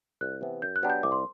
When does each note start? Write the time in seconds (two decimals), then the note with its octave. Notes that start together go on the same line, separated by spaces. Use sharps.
0.21 C2 F#6
0.41 C3 E3 B3
0.62 F#2 G6
0.76 F#6
0.83 F#3 B3 D4 G4
0.90 G6
1.03 C2 D6
1.12 C6